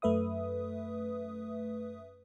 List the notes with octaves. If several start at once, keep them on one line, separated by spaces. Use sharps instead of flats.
F#2 A3 B4 E5 D#6